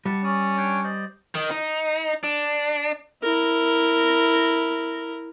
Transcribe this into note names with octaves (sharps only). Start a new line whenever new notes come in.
G3 F#5 A5
C#4 D5 D#6
D4 C#5 G5
C5 D5 D#5
D#3
D#4
D4
E4 A#4